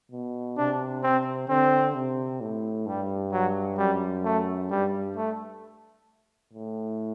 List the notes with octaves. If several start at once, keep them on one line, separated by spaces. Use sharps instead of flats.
B2
C3 D4
C4
D3 C4
C3
A2
G2 G3
F#3
F#2 G3
A3
G2 G3
A3
A2